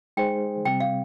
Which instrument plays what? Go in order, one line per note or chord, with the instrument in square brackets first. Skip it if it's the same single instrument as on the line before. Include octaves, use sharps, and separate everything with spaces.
[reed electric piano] G#3 D#4 G#4 C5 [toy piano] G5
[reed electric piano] C3 G3 C4 [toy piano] G5
[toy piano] F5